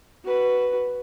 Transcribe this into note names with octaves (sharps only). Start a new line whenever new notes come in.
F#4 B4